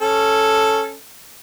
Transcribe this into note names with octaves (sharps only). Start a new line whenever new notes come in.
C#4 A4